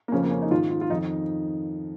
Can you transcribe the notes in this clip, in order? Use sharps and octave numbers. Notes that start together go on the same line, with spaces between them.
A#3
F2 C#3 F3 C#4
A#3
C#4
D#4
G#2 D#3 F4
F4
F4
F2 D#3 D#4